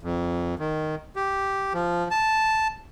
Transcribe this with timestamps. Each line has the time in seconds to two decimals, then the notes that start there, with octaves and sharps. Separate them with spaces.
0.03 F2
0.59 D#3
1.16 G4
1.74 F3
2.11 A5